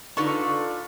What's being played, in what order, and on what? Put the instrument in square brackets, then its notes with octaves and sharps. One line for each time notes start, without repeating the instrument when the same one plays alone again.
[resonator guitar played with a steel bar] D3 D#4 B4 [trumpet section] F4 A4 D5 [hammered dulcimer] C#6